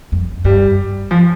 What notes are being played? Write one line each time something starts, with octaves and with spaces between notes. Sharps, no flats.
F2
G2 G3
F3